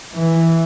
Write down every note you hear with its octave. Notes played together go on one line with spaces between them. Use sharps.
E3